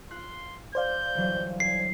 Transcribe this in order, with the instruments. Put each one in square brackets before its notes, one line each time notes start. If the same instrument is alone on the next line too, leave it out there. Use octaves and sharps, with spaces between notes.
[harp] F4 F#6 C7 [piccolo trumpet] C6
[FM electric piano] C5 D5 F5 [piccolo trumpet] G6
[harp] G1 E3 F#3
[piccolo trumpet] G#5 [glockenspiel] C7